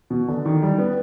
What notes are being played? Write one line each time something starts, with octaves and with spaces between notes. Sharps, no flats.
B2
D3
D#3
G3
B3